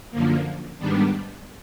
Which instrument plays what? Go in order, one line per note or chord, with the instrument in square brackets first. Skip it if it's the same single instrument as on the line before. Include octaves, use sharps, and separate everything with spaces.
[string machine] F#2 D3 F3 A#3
G#2 D#3 G3 B3 D4